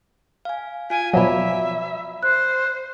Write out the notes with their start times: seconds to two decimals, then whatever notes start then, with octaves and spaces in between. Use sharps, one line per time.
0.45 F5 G#5
0.90 F4 F5 G#5 D7
1.13 B2 F3 F#3 D5 E5 A#5 B5
2.23 C5 F#6